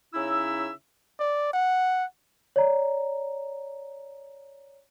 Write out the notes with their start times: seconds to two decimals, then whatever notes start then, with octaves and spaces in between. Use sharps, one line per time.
0.14 C#3 C#4 D#4 E4 E5 E6
1.20 D5
1.53 F#5
2.56 C#5 D5 A#5